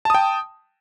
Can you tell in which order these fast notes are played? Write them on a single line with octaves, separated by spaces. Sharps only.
A5 D#6 G5